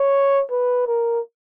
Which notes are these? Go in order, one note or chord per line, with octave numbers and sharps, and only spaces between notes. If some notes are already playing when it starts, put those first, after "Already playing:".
Already playing: C#5
B4
A#4